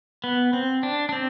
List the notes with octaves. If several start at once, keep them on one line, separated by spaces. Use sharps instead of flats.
B3
C4
D4
D4
C4